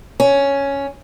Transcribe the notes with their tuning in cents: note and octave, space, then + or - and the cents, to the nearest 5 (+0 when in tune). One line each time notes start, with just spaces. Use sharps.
C#4 +5